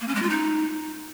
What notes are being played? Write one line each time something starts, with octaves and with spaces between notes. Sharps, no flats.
A#3
C#4
G#3
F4
D#4